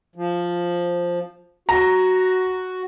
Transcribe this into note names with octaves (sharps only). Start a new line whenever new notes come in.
F3
F#4 A#5